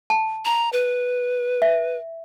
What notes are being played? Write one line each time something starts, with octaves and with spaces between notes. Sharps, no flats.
A5
A#5
B4
E5